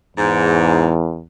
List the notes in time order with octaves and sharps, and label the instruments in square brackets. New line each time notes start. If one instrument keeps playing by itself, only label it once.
[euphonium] E2 [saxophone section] G#2